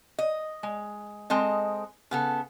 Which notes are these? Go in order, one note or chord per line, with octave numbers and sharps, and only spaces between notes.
D#5
G#3
G#3 C4 A4 D#5
C#3 B3 A4